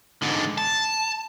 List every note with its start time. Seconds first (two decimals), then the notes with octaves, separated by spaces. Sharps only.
0.22 G#2 D3
0.58 A5